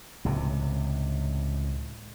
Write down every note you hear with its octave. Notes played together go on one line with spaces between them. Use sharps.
C#2 A2 C3